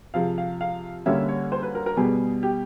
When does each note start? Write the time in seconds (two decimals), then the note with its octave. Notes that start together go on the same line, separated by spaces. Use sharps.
0.14 C3 F3 G#3 F5
0.38 F5
0.61 F5
1.06 D3 G3 A#3 C#4 E5
1.29 C#5
1.52 C5
1.63 B4
1.75 A#4
1.86 A#4
1.97 B2 G3 B3 G#4
2.43 G4